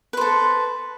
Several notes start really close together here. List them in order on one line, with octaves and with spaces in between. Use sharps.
B4 C5 A4